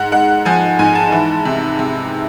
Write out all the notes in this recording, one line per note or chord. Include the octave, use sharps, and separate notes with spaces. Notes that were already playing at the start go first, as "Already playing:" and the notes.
Already playing: G#2 F#5
G#3 F#5
F3 G#5
G#2 G#5
A5
E3
C3
C3